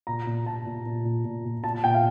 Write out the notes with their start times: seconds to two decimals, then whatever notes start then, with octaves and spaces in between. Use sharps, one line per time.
0.07 A#2 A#5
0.27 A#2
0.46 A#2 A5
0.66 A#2
0.86 A#2
1.05 A#2
1.25 A#2
1.45 A#2
1.64 A#2 A5
1.75 A5
1.84 A#2 G5
1.94 F5